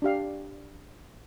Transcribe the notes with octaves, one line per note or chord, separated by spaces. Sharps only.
D4 G4 F5